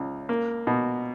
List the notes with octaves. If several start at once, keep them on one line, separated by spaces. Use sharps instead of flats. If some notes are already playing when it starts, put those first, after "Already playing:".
Already playing: C#2
A#3
B2